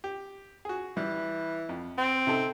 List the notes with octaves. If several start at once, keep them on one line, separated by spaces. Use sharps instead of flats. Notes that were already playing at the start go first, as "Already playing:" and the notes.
G4
F#4 G#4
E3 G3
F2
C4
C3 D#4 A4